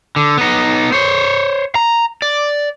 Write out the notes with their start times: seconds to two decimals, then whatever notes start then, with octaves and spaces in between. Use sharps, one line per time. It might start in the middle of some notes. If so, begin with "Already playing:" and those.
0.16 D3
0.37 B3 D#4
0.92 C5 C#5
1.75 A#5
2.22 D5